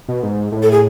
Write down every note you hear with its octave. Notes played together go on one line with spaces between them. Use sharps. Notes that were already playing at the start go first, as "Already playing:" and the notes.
B2
G#2
A2
A4
G#4